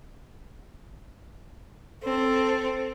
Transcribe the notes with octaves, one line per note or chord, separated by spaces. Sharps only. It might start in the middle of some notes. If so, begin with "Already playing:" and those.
C4 A4